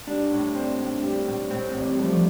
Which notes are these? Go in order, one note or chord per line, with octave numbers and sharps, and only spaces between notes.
G3 D4
A2
C4
A2
G3
A2
A2 C4
C4
A1
G3
G3 A3
F3